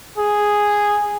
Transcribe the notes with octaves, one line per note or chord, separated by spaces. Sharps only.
G#4